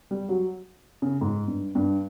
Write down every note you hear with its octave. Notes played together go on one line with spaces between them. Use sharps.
G3
F#3
C#3
G#2
G2
G2